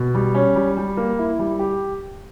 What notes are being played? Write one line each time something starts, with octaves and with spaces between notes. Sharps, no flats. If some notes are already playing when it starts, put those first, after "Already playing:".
Already playing: B2
G3
C#4
G3
G3
A#3
E4
G3
G4